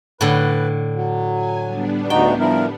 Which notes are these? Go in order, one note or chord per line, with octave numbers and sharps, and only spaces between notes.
A2 D3 B4
F#3
G#5
G3 B3 D4
D2 D#4 F#4 G5
F3 E4 A#4